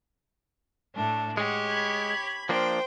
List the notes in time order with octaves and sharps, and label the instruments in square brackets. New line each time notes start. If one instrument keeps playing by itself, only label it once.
[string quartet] A2 A3 [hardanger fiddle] D4
[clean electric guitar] G#3 [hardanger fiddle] G4 C#5 [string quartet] F#5
[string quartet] B5 G#6
[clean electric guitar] F3 A#3 D4 [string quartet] C5 [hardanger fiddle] G5